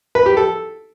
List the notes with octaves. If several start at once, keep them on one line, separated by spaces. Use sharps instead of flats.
B4
G4
A4